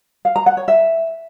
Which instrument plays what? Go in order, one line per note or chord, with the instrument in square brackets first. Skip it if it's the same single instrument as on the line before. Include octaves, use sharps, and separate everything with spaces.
[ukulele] F5
A#5
F#5
C#5
E5